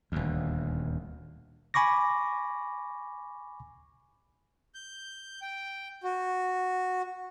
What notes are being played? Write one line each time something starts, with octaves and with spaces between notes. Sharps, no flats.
D#1 D2
G#5 B5 C#6 D6 A#6
G6
G5
F#4